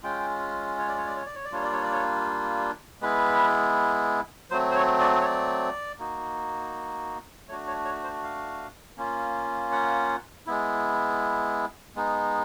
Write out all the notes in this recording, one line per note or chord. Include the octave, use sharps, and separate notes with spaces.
G#3 C#4 F4 G5
C#5
D5
C#5
D5
C#5
D5
C#5
D5
G3 A#3 D4 F4 C#5
D5
C#5
D5
C#5
G#3 B3 E4 B4
F#3 A3 C4 C5
C5
C#5
D5
C#5
D5
A#3 D#4 F#4
A3 D4 F#4 C#5
C#5
C#5
C5
F5
A#3 C#4 F4
F#5
G#3 B3 E4
G#3 B3 D#4